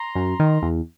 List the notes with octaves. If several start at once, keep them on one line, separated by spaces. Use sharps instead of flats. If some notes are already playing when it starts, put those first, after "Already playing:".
Already playing: A#5 C6
F#2
D#3
E2